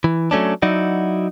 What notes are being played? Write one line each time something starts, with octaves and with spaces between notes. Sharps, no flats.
E3
F#3 A3 C#4 D4
F#3 D#4 E4 F#4 D5